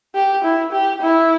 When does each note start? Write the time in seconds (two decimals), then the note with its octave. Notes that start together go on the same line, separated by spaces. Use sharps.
0.15 G4
0.44 E4
0.72 G4
1.01 E4